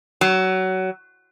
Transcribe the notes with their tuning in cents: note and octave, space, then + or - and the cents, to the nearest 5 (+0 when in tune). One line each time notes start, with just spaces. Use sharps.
F#3 +20